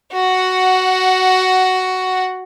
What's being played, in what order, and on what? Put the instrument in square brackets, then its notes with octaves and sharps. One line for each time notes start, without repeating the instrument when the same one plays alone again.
[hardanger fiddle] F#4 F#5